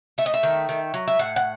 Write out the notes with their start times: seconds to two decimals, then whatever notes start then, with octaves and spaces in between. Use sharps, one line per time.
0.18 A3 E5
0.26 D#5
0.34 E5
0.43 D#3
0.69 D#3
0.94 F#3
1.08 E5
1.19 A2 F#5
1.36 F#5